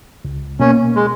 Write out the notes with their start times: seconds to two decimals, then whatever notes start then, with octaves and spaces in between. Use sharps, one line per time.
0.25 C#2
0.60 B2 A#3 C#4
0.95 G#3